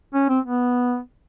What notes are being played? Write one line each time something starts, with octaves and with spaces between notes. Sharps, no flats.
C#4
C4
B3